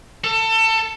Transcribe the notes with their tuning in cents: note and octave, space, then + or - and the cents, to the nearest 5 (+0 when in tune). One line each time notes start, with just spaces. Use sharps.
A4 +25